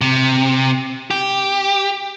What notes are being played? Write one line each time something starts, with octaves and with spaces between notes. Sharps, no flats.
C3
G4